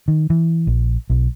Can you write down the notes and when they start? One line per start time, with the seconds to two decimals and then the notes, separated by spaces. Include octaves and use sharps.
0.08 D#3
0.30 E3
0.67 A#1
1.10 B1